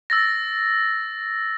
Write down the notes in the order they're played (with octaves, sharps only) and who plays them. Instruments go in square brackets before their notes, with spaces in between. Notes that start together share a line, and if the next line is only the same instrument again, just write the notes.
[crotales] E6 A6 A#6